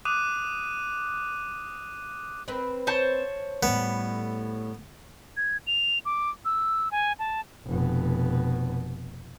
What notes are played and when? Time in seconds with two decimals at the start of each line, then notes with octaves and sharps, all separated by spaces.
0.05 D6 D#6 F#6 D#7
2.48 C4 A#4 B4
2.87 C5 C#5 A5
3.63 A2 G3 B3
5.37 G#6
5.67 F7
6.05 D6
6.45 E6
6.91 G#5
7.19 A5
7.67 F1 B2